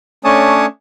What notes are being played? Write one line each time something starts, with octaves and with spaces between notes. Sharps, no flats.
A3 C#4 D4 C#5 A5 D#6